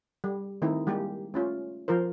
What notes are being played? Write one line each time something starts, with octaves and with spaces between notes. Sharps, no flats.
G3
D#3 A3 C4 D#4 E4
G3 G#3 A#3 G4
A3 C#4 F4
F3 F4 A#4 C5